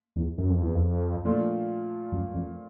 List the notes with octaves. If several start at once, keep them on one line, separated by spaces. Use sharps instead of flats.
E2
F#2
F2
E2
F2
A#2 F3 A3 D4 F4
F#2
F2